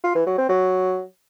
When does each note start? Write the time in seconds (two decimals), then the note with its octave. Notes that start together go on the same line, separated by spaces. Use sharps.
0.04 F4
0.15 E3
0.27 F#3
0.38 C4
0.49 F#3